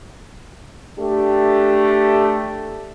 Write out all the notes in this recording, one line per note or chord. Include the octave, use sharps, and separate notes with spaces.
A3 D4 G4